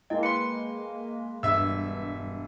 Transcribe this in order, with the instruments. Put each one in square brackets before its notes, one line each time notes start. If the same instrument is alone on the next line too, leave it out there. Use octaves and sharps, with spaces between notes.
[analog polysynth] G#3 A#3 [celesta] E4 D#5 [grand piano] G5
[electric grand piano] B4 C6 [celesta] C#7
[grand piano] E1 [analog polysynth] G2 [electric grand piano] E5 E6